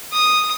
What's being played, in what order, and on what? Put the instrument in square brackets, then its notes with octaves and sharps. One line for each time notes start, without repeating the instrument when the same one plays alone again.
[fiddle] D#6